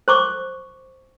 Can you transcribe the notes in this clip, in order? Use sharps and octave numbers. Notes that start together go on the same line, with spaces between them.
C5 C#6 D6